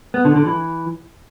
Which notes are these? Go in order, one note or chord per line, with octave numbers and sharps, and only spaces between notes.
B3
D3
D3
E3